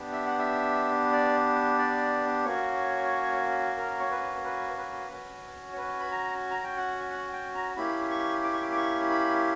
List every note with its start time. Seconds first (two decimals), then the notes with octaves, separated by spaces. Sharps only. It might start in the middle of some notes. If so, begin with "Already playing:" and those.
Already playing: B3 D4 G4
0.12 E5
0.26 F#5
0.39 E5
1.12 D5
1.78 D5
2.45 A#3 C#4 F#4 C#5
3.78 A#4
4.00 C#5
4.11 B4
4.44 B4
4.78 B4
5.11 C#4 F#4
5.73 C#5
5.77 B4
6.00 B5
6.11 A#5
6.51 A#5
6.64 G5
6.77 F#5
7.11 F#5
7.33 G5
7.55 A#5
7.76 A#3 C#4 E4 G4 B5
8.10 C#6
8.44 D6
8.53 C#6
8.62 D6
8.72 D6
8.77 C#6
9.10 B5